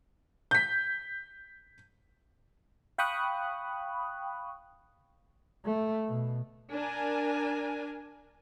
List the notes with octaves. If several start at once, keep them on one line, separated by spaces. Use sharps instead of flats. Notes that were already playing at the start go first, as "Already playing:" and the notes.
G6 B6
F5 G5 B5 C#6 D#6 F#6
A3
B2
D4 A#4 G#5